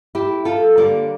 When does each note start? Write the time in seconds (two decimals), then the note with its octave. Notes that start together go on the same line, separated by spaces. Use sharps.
0.15 E4 G4
0.45 F4 A4
0.77 D3 G3 A#3 A#4 D5